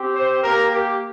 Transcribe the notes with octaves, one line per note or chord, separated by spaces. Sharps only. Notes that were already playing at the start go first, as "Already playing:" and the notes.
Already playing: C4 G4
C5
A#3 G4 A#4
G4